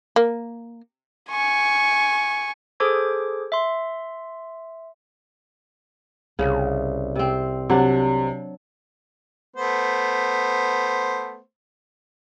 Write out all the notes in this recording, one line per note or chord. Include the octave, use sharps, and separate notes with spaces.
A#3
G#5 C#6
G#4 A4 C5 D6 D#6 G#6
E5 C6
C2 C#3
C3 C4
C3 F#3 D4
A3 B3 C5